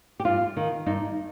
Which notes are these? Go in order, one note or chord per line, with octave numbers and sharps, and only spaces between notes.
G4
G2 F4
D#3
G2 D#4